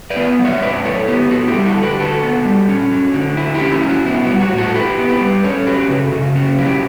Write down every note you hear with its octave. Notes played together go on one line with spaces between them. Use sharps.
B4 D5
B3
F#3
C#5 E5
F#3 B4 D5
E4 A4 C#5
B3 G4 B4
B3 F#4 A4
E4 G4
G3
F#4 A4
D3
G4 B4
D3 F#4 A4
B3
G3
C#4
F#3
D3
E4
E4 G4
C#4
E4
F#3
F#4
B3 E4
F#4
G3
F#4
A2
F#4 A4
E4 G4 B4
B3
G4 B4
G3
C#4 A4 C#5
F#3 G4 B4
C#3 F#4 A4
C#3 F#4
C#4 F#4
F#3 E4 G4